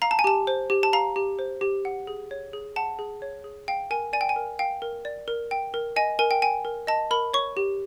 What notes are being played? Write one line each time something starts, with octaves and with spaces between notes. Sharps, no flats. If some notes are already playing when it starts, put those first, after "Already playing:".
F5 A#5
A5
G#5
G4 A5
C5
G4
A5
F5 A#5
G4
C5
G4
F#5
G#4
C#5
G#4
F#5 A5
G#4
C#5
G#4
F5 G5
A#4 G#5
D5 G#5
G5
G#5
A#4
F5 G5
A#4
D5
A#4
G5
A#4
D#5 G#5
A#4 G#5
G5
G5 G#5
A#4
D#5 A5
A#4 B5
C#5 C#6
G4